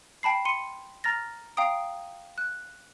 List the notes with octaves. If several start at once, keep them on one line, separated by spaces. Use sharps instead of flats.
G5 A5 B5 C7
C6 C#7 D#7
A#5 F6 A6 A#6
F5 G5 A#5 D#6 D7
F#6